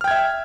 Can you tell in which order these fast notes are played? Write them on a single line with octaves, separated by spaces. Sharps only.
F6 G5 G#6 E5